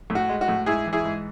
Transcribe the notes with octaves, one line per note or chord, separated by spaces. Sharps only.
A2
F#4
G#3
F#4
A2
G#2 E4 G#4
E3
E4 G#4
G#2